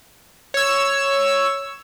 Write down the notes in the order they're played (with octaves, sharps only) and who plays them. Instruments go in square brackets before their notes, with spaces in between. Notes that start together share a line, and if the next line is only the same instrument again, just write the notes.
[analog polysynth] C#5 E6